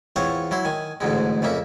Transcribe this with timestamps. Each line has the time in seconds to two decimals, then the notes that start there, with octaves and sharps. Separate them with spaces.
0.16 E2 C4 F4 C5 C#5
0.51 F#3 E4 C6
0.65 D#3 G#5
1.01 A1 D2 G#2 G#3
1.42 F2 C#3 A#3 E5